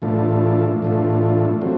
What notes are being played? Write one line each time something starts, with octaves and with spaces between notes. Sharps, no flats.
A2 E3 A3 D4 F4
A2 E3 A3 D4 F4
F#3 A3 C4